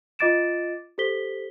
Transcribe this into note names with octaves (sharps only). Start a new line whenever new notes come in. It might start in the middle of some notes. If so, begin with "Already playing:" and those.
F4 D#5 D6 A6 D7 E7
G4 A4 C5 B6 G7